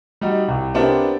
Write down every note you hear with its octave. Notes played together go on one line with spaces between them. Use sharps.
G3 D#4 F#4
C2
B3 C4 D4 E4 G4 A#4